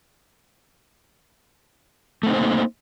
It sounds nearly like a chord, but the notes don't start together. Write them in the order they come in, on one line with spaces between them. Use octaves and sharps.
A3 C4 D#4 C5 A#3